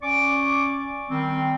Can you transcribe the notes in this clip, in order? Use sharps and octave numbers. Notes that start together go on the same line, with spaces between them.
C#4 D5 C#6 D6
D#3 G3 C4